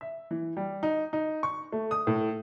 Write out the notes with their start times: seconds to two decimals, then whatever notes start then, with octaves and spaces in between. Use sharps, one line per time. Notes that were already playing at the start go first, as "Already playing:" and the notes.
0.01 E5
0.31 E3
0.57 G3
0.83 D#4
1.13 D#4
1.43 C#6
1.72 A3
1.91 D#6
2.07 A2